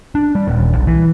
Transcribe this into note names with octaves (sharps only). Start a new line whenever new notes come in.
D4
G3
D#1
B1
E3